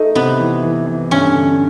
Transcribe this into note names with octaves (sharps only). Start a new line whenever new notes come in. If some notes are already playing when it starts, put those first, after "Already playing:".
Already playing: A3 D#4
C3 B3
E3
E3
E3
G2 C#4
D3